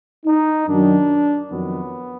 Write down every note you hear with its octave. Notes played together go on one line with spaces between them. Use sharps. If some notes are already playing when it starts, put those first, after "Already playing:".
D#4
F#2 D#3 F#3 D4
F2 D#3 F#3 B3